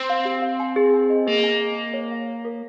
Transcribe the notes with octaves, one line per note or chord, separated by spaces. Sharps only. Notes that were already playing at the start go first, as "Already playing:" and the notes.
Already playing: C4
F5
G4
F5
G#5
G#4
G#5
D#5
A#3 G#4
G#5
D#5
G#5
C#5
F5
C#5
A#4